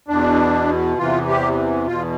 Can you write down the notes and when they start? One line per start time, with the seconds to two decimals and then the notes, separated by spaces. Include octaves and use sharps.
0.08 E2 B2 D4
0.98 E2 C3 E3 F4
1.28 G4
1.87 E2 B2 F4